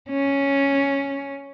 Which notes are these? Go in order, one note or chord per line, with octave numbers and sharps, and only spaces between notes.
C#4